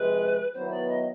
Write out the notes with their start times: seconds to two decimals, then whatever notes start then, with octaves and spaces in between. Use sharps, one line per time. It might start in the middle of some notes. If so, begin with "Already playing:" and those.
Already playing: C3 F3 G#3 B4
0.53 D#3 F#3 B3 E4 C5
0.71 D5
0.88 D#5